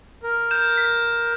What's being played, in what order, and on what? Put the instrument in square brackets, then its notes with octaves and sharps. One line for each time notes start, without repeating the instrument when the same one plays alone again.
[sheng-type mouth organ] A#4
[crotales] G6 E7
B6